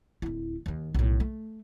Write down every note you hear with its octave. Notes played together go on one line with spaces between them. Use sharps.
D1 E4
D#2 D#3
B1 A2
A3